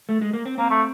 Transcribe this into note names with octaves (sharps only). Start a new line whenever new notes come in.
A3
G#3
A#3
C4
A#3 C4
A3